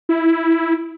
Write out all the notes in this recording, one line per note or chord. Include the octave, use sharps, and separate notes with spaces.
E4